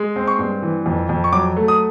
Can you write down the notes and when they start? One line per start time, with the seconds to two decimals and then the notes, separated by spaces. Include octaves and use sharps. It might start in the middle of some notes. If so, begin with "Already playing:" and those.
Already playing: G#3
0.16 C4
0.28 C#6
0.39 G2
0.62 E3
0.86 F2
1.09 F2
1.24 C#6
1.33 F#3 D6
1.57 A3
1.68 D#6